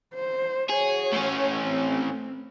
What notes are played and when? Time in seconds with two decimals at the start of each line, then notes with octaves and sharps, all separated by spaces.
0.15 C5
0.70 F#4 G#4 C#5
1.13 A2 C#4
1.61 C4